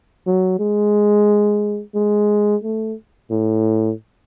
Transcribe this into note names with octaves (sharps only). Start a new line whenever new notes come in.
F#3
G#3
G#3
A3
A2